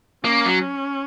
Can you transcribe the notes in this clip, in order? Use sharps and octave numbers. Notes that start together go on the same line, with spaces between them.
A#3 C#4
F#3